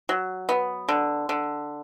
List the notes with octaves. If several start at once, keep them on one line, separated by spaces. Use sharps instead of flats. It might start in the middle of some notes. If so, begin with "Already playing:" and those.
F#3
B3
D3
D3